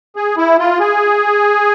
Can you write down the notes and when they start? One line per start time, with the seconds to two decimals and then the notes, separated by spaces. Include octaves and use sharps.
0.16 G#4
0.37 E4
0.59 F4
0.80 G#4